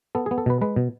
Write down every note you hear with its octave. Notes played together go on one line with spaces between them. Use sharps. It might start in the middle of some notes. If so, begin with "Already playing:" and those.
B3 A4
B3 G#4
A4
B2 B4
G#3 B4
B2